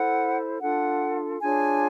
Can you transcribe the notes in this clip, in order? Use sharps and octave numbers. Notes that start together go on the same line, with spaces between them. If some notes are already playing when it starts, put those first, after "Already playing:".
Already playing: E4 A4 C5 F#5
D4 F4 A4 F#5
D4 F4 G#4 C#5 G#5